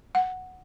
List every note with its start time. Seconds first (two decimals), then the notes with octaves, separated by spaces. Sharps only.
0.15 F#5